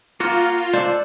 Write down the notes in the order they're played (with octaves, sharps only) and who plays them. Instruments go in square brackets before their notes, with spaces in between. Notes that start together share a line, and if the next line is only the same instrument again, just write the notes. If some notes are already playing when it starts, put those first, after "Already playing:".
[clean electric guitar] A#3 F#4 [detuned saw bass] F4
[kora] D4 [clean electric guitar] A4 C5